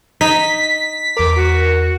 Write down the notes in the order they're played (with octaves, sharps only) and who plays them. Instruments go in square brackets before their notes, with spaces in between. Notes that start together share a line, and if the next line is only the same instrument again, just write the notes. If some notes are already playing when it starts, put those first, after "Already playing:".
[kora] D#4 [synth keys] B6
[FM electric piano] E2 A#4 [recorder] D6
[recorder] F#4